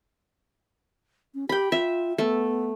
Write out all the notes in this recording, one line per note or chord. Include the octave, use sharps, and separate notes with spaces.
C#4
G4 G5 B5
F4 E5
A3 B3